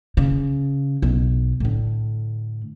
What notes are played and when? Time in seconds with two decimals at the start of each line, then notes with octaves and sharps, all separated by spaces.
0.17 C#3
1.02 B1
1.60 A2 D3